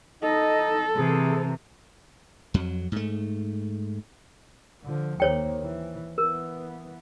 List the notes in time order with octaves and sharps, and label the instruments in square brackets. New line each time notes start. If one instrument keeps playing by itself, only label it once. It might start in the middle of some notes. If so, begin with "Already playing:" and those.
[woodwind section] D#4 D#5 [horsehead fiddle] A4
[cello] C3 E3 [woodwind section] G#4
[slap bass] F2 F#3
G#2 A3
[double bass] D3 F3
[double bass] D#2 A#3 [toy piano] C5 C#5 G5
[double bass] E3
[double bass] E3 B3 [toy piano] A#4